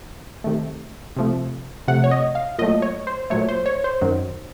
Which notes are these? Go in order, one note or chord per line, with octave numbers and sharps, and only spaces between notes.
C3 D#3 A3
C3 F3 A3
C3 F3 A3 F#5
C#5
D#5
F5
A#2 F#3 A3 D#5
C#5
C5
A#2 F#3 A3 C#5
C5
C#5
C5
F#2 D#3 F#3